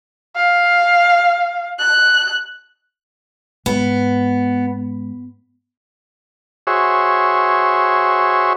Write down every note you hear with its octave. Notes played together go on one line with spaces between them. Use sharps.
F5
F#6
G#2 B3
F#4 G#4 C5 C#5 E5